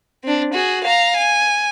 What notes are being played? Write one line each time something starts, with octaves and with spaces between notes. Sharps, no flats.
C4 D4
F#4 G#4
F5 A#5
G#5